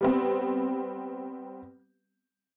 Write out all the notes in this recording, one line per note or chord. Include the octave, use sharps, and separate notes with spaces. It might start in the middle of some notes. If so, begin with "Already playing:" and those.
G3 B3 C4